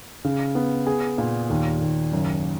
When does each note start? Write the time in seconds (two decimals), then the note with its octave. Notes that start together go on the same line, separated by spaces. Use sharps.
0.24 C#3
0.55 B3
0.87 G#4
1.18 A#2
1.50 D#2
1.81 D#2
2.12 F#1